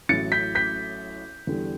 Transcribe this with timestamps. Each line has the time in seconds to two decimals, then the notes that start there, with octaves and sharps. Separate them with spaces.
0.09 A1 A2 F#3 A6 C#7
0.32 G6 B6
0.55 G6 B6
1.47 E2 D3 G3